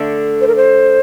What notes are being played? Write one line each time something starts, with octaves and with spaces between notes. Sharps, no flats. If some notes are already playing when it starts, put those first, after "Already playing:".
Already playing: D3 A3 D4
C5
A#4
C5